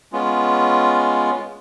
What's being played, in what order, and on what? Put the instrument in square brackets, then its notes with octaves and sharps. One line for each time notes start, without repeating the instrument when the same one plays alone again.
[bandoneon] G#3 B3 C#4 F4